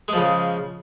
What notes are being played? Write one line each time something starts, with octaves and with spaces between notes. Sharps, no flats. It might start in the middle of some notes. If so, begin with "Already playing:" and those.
C#3 F3 G#3